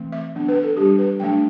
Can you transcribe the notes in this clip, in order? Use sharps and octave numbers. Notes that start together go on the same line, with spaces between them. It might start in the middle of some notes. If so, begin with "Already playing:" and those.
Already playing: E3 A3 C4
E5
F#3 B3 D4
B4
A4
G3 D4 G4
B4
F#3 A3 D4 G5